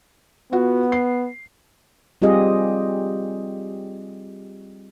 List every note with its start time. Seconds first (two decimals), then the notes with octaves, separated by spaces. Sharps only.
0.52 B3 F4 F#4
0.92 C7
2.22 G3 C4 F4 G4 G#4 D#5